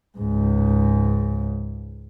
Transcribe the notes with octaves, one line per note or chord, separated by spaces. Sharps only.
C#2 G#2